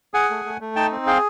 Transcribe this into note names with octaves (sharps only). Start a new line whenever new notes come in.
G#4 F#5 G#5
A3
A3
A3
D#4 G5 A5
C4
G#4 F5 G5